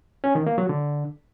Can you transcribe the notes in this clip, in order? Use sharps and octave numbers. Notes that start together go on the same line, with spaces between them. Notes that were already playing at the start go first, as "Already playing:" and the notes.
C#4
D#3
A#3
F#3
D3